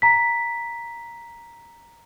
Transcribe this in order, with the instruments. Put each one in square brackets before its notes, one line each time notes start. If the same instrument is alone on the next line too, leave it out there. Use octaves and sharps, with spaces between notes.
[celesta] A#5 B6